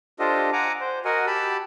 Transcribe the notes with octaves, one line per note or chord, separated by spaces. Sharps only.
D4 F4 G4 A4 C5 D#5
F#5 G#5 A#5 D6
C5
F#4 A#4 D#5 F#5 G#5
G4 A5 B5 E6